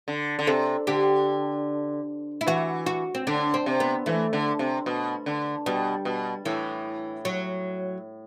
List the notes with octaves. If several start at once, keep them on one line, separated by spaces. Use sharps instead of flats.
D3
D3
C3 A4
D3 G4
E4
E3 F#4
F#4
C4
D3 D4
C4
C3
B3
E3 A3
D3
C3
B2
D3
B2 G3
B2
A2 E3
F#3